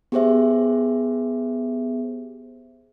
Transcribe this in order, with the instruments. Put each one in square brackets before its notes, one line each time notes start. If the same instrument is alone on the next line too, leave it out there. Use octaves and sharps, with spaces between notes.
[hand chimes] B3 G4 G#4 C5 E5